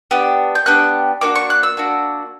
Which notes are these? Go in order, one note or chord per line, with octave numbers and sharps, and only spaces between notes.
B3 D4 G4
G6
B3 D4 G4 F#6
A#3 D4 F#4 D6
C#6
F#6
E6
A#3 D4 F#4